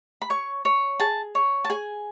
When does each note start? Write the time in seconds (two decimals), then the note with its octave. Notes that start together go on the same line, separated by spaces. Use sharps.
0.22 B5
0.30 C#5 C#6
0.65 C#5
1.00 G#4 A5
1.35 C#5
1.64 A5
1.70 G#4 G#5